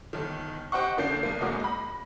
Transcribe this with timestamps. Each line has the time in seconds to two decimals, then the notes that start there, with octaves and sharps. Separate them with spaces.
0.13 G1 D#3
0.72 G4 C5 D#5 F#5 C#6
0.97 F#2 D3 A#3 D4 G6 C7
1.23 C2 A#3
1.41 G#1 E2 G#3 A#3 F#4 D#5
1.60 B5 A#6